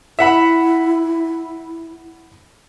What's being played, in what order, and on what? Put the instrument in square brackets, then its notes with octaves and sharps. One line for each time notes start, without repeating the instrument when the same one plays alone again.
[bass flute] E4 [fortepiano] E5 F#5 B5